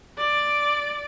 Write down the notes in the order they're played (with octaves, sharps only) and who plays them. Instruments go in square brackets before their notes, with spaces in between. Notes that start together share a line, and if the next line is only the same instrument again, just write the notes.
[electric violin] D5 D7